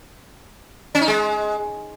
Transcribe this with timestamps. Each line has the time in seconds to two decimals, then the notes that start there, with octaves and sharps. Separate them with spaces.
0.95 C#4
1.01 D#4
1.08 G#3